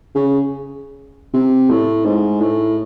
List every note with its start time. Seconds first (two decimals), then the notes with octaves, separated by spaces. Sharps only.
0.15 C#3
1.34 C3
1.70 A2
2.05 G#2
2.41 A2